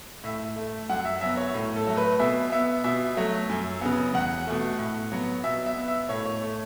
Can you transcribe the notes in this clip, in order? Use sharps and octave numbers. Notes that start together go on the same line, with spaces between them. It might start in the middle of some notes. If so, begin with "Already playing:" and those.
A2 E5
A3
F#2 F#5
E5
F#3 B3 E5
C#5
A2
A4
F#3 A3
B4
B2 E5
B3 E5
B2 E5
F#3 A3
F#2
C#3 F#3 B3
E2 F#5
B2 A3
A2
F#3 B3
B2 E5
E5
B3
E5
A2 C#5
C#5
A3